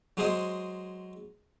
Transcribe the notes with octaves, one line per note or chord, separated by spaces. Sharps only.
F#3 G#3 G#4 C5 D#5